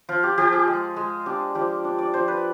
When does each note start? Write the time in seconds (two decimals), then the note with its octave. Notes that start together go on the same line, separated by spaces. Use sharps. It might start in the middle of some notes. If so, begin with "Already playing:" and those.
0.09 F3 F4
0.23 G4
0.38 F3 G4
0.52 G#4
0.67 G#3
0.96 G#3
1.26 D4 G4
1.55 F3 G4
1.85 D4
1.99 D5
2.14 F3 C5
2.28 B4